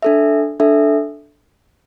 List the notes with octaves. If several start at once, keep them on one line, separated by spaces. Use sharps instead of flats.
D4 A4 E5
D4 A4 E5